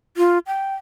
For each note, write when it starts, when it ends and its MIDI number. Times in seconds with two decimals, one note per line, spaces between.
0.17 0.39 65
0.47 0.75 79